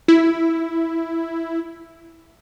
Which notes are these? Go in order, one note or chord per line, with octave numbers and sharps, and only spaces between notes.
E4